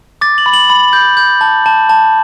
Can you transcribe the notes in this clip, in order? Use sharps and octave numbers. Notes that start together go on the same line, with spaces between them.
D6 A6
F#7
B5
F#7
B5
G6
G6
A5
A5
A5